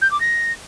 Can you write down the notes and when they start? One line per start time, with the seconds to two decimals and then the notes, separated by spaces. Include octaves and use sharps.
0.01 G6
0.11 D6
0.20 A#6